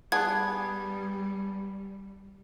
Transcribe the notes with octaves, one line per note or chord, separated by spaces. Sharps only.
G3 B3 D4 G#4 G#6